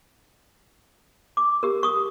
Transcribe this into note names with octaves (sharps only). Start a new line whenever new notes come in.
D6
G4 A#4
C#6 D#6